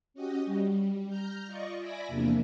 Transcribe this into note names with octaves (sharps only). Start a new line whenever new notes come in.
C#4 F#4 G4 D#5
G3
A#5 F6 G6
F4 D5 D#5 C#6
D5 E5 G#5 B5 D6 A#6
E2 C3 F3 A#3 D4